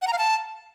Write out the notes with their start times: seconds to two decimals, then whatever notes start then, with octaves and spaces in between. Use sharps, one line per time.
0.02 F#5
0.07 A#5
0.13 F5
0.18 A5